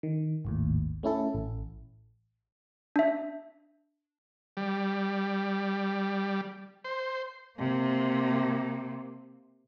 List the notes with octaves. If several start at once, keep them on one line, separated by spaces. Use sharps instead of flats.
D#3
G#1 D#2 A2
A3 C#4 E4 A4
A1
D4 E5
G3
C5
C3 A#3